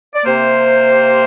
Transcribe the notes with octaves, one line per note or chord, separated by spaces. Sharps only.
D5
C3 A#3 C5